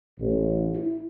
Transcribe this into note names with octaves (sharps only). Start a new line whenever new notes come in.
A1
E4